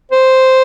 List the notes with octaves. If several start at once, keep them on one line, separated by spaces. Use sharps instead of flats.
C5